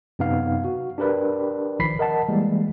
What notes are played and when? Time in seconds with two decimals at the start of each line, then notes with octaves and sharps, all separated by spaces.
0.19 F#2 C3 B3 D#4 F5
0.64 F#4
0.98 D4 G4 A#4 B4 D5
1.79 A#1 D#3 F3 B5 B6 C7
1.99 A#4 D#5 F#5 A5
2.29 E3 G3 G#3 A#3